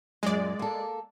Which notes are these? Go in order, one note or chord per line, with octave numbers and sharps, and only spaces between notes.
F#2 A#2 G#3 D5
A#3 A4